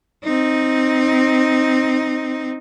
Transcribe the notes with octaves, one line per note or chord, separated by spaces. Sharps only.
C4 D#4